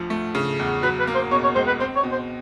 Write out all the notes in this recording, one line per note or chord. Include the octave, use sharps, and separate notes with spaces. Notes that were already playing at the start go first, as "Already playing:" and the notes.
Already playing: D2 F3
A3
C#3
E2
F#3 B4
B4
A#3
C5
B2 C#5
C#5
C#2 C5
B4
C4 C5
C#5
B2
C5